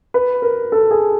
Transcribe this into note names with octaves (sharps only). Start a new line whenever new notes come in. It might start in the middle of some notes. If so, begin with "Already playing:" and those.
B4
A#4
A4
G#4